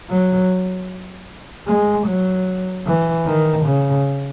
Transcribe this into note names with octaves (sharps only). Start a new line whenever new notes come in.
F#3
G#3
F#3
E3
D#3
C#3